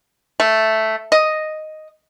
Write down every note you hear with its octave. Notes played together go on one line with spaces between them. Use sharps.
A3
D#5